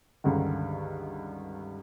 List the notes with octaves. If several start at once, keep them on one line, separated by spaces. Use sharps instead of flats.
C#2 G2 D3 D#3